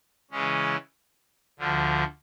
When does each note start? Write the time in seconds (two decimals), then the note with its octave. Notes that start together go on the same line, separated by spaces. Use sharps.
0.31 C#3 E3 G#3 C#4
1.59 D2 D3 F3